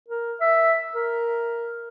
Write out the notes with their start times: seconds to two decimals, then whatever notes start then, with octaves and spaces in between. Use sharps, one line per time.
0.09 A#4
0.41 E5
0.94 A#4